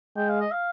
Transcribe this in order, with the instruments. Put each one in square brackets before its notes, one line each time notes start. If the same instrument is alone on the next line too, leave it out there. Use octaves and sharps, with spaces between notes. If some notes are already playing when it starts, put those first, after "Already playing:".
[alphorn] G#3 [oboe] G5
[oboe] F5
D#5
F5